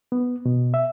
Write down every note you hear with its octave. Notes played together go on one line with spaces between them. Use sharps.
B3
B2
E5